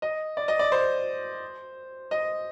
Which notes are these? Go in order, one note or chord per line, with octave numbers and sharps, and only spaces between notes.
D#5
D5
D#5
D5
C5
D#5